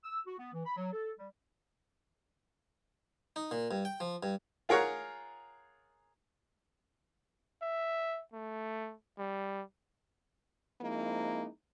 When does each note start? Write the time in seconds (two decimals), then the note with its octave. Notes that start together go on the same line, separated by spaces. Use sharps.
0.04 E6
0.26 F#4
0.39 B3
0.53 E3
0.65 B5
0.77 F#3
0.93 A4
1.17 G3
3.36 D#4
3.51 A#2
3.71 G2
3.85 G5
4.00 F3
4.23 G2
4.69 F4 G#4 A#4 C#5 F#5
7.62 E5
8.33 A3
9.18 G3
10.81 F3 G#3 A#3 C4 D#4 E4